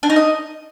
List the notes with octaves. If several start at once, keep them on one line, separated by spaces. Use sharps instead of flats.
D4
D#4
D#5